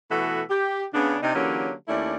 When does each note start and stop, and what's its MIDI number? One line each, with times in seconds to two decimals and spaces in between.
0.11 0.41 47
0.11 0.41 52
0.11 0.41 57
0.11 0.41 66
0.11 0.41 69
0.11 0.41 76
0.49 0.84 67
0.94 1.16 49
0.94 1.16 59
0.94 1.16 62
1.23 1.33 48
1.23 1.33 62
1.23 1.33 63
1.34 1.72 50
1.34 1.72 52
1.34 1.72 54
1.34 1.72 58
1.34 1.72 61
1.34 1.72 67
1.88 2.17 39
1.88 2.17 57
1.88 2.17 61
1.88 2.17 62
1.88 2.17 64
1.88 2.17 74